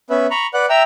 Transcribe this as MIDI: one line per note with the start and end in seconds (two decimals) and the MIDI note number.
0.10 0.27 59
0.10 0.27 61
0.10 0.27 71
0.10 0.27 76
0.31 0.47 82
0.31 0.47 83
0.31 0.47 85
0.54 0.66 71
0.54 0.66 74
0.54 0.66 78
0.54 0.66 90
0.70 0.83 76
0.70 0.83 79
0.70 0.83 82
0.70 0.83 88